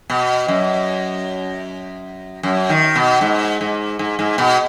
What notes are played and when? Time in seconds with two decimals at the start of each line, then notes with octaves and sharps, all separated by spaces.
0.10 B2
0.48 F#2
2.43 F#2
2.70 D#3
2.96 B2
3.21 G#2
3.61 G#2
3.99 G#2
4.19 G#2
4.38 B2